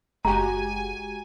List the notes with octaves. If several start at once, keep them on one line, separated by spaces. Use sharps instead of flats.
F#1 G#3 F#4 G4 G#5 A#5